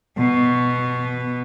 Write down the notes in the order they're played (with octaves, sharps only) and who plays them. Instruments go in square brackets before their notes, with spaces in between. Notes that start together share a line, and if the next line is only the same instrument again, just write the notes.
[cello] B2 B3